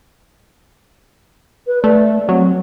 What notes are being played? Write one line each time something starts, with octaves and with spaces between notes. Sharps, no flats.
B4
A3 D5
F#3 C4